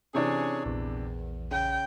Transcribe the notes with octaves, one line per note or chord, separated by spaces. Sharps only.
C3 E3 C#4 D4 G#4 C#5
A#1 E2
C#3 G5